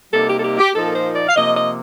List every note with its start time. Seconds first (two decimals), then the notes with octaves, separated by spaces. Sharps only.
0.13 C3 G3 A#3 D#4 A4
0.28 G4
0.37 A4
0.43 G4
0.59 G4
0.74 A#2 F3 A#3 D#4 A4
0.94 C5
1.15 D5
1.28 F5
1.36 C3 F3 A#3 D#5
1.56 D#5